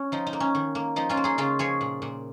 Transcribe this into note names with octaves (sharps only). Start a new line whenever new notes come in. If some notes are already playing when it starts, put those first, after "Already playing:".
Already playing: C#4
F3 D#4
D#4
A#3
C#4
D#3
A#3
F3 D#4
C#4 F4
A#3
D#4 G#4
C#3 C#4 F4
F3 G#4 C#5
A#2
A#2